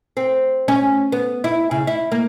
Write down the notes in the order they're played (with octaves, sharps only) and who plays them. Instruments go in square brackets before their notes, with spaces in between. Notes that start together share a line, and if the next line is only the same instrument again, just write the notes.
[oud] C4
C#4
B3
E4
C#3
E4
A#3